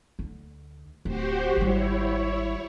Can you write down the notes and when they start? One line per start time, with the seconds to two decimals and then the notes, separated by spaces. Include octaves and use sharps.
0.19 D2
1.05 D1 F#4 G4 C5
1.56 G#1 G3 E4 C#5